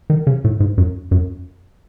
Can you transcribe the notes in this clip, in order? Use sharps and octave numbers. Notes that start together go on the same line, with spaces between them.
D#3
C#3
A2
G#2
F#2
F#2